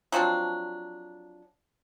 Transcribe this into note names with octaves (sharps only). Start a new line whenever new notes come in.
F3 F#3 C4 D4